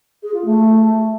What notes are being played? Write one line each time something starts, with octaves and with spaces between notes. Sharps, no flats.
G#4
F4
A3